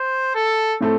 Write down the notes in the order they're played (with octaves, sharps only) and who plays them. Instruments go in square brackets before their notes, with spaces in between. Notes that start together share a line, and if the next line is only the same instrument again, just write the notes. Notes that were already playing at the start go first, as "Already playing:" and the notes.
Already playing: [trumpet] C5
A4
[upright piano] A2 A3 C4 A4